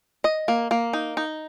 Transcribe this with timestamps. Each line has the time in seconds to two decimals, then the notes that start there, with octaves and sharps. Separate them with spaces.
0.24 D#5
0.48 A#3
0.71 A#3
0.93 D#4
1.17 D#4